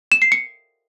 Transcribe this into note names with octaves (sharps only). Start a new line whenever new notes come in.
E7
C7
C#7